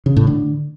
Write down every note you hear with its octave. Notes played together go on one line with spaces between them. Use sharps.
C#3
A2
D3